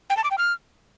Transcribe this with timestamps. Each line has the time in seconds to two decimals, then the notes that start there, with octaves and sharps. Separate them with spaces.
0.10 G5
0.17 A5
0.24 D6
0.31 G5
0.38 F6